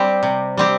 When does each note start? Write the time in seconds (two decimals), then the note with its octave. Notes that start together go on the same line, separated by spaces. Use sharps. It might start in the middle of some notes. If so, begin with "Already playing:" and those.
Already playing: G3 C4 G4
0.23 C3
0.57 G3 C4 G4